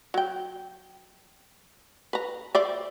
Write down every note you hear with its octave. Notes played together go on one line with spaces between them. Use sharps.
F#3 G5
B4 A#5
C5 D5 E5